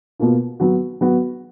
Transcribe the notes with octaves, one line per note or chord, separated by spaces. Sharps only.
B2 A#3 F4
F#3 B3 F#4
F#3 B3 F#4